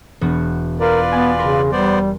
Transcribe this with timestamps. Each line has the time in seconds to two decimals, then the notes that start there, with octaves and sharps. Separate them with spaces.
0.21 E1 B3 F#4
0.80 F4 A#4 B4 D5
1.12 B3 G#5 F#6 A6
1.39 C#3 A#4 B5 C6
1.72 G3 B3 C5 D5